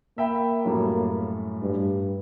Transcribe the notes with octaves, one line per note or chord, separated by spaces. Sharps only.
A#3 E5 G5 B5
F#2 A2 G3
G2